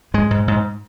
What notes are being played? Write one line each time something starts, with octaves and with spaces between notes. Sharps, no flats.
G#2 G#3
G#2
G#2